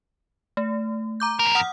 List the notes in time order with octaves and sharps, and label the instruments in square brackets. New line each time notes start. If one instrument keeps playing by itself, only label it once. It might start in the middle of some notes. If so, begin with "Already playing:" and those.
[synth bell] A3
A#5 D6 G6
[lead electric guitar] E2 A#4
[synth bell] F#5 D#6 F6